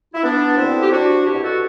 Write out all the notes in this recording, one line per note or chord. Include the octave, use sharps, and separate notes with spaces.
E4
B3 D4
D2 D3 C4 E4
G4
D4 F#4
C2 B2 E4 G4
F#4 A4